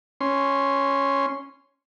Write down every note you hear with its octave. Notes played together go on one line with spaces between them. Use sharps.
C#4 C6